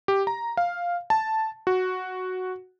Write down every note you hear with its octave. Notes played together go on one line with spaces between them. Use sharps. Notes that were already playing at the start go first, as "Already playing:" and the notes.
G4
A#5
F5
A5
F#4